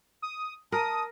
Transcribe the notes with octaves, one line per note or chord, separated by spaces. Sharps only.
D#6
A#4 A5 D#6